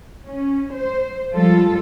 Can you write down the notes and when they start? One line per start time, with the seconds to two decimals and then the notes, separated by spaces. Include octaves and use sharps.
0.25 C#4
0.73 C5
1.31 F3 G3 G#3 F4 A4